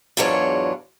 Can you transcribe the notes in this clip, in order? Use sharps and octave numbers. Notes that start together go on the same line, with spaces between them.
E2 G#2 F#3 D4 F4 C#5